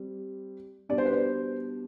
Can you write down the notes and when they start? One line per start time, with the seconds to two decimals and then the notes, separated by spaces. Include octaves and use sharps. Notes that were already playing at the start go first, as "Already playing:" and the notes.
Already playing: G3 C4
0.89 B2 G3 D4 D5
0.98 C5
1.05 B4
1.13 C5